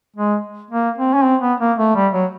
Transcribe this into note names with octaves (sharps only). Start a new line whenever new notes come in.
G#3
A#3
C4
C#4
C4
B3
A#3
A3
G3
F#3